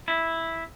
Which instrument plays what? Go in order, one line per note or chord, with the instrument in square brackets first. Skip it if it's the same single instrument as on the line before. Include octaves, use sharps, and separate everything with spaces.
[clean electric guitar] E4